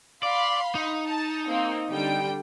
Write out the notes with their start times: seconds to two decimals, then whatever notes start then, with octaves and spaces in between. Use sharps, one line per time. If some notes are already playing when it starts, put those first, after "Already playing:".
0.23 D5 F5 B5 C6
0.75 D#4
1.07 A5
1.49 A#3 C4
1.89 D3 G3 G5